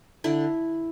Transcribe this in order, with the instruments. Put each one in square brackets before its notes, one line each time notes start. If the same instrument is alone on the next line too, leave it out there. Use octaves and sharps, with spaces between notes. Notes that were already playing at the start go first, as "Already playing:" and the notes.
[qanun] D3 E4